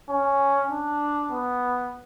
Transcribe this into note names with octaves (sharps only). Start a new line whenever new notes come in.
C#4
D4
B3